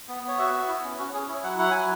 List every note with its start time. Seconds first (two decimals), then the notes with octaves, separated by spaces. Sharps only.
0.08 B3
0.23 B3 C#5
0.38 F#4 E5
0.53 B3
0.68 E4
0.84 C#4
0.98 C#4 F#4
1.13 C#4 G#4
1.28 E4 C#5
1.43 F#3 F#5
1.58 E4 F#5
1.71 F#3 G#5